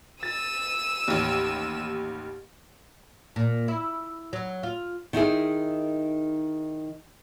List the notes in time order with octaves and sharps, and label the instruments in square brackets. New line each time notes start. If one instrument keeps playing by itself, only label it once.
[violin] E6 D#7 [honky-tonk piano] A6
[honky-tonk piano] A1 D#2
[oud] A#2
E4
F#3
F4
[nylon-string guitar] D#3 D#4 E4 G#4